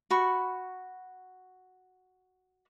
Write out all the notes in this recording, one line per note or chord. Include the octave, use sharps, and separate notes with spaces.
F#4 B5 C#6